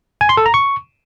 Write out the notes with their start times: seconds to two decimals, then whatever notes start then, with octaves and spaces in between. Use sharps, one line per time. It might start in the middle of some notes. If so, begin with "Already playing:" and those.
0.21 G#5
0.29 C6
0.37 A4
0.46 A#5
0.54 C#6